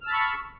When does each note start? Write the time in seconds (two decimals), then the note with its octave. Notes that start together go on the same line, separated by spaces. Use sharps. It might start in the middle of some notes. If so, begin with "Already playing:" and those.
0.01 F6
0.04 E6
0.07 A5
0.10 B5
0.13 C#6